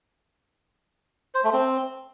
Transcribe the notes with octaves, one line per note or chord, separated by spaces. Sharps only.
C5
A3
C4